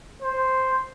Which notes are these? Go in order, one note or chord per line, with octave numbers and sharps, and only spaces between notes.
C5